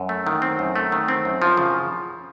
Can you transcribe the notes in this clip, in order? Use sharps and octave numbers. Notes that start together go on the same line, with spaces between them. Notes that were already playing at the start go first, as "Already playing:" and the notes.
Already playing: F#2
A3
D#3
C4
F#2
A3
D#3
C4
F#2
F3
C#3